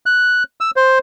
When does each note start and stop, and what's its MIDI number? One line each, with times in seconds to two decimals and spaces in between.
0.06 0.43 90
0.61 0.71 88
0.76 0.99 72